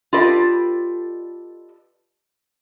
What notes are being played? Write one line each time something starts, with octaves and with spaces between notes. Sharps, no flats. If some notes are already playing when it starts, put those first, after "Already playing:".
F4 G4 A4 B4 D5 D#5